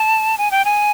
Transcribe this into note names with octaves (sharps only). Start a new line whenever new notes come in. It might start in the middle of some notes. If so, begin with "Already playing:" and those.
Already playing: A5
G#5
G5
G#5